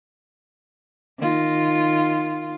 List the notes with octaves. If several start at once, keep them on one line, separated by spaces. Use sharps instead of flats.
D#3 F4